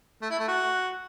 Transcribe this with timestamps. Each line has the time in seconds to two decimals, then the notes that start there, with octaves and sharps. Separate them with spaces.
0.22 A3
0.31 E4
0.39 A3
0.48 F#4